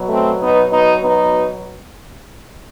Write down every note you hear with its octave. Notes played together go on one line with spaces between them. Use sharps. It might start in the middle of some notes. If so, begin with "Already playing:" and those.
Already playing: B2 F#3
A3 C4
B3 D#4
B3 D#4
B3 D#4